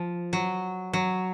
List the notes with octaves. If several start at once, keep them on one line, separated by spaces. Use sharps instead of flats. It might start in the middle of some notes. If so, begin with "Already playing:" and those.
Already playing: F3
F#3
F#3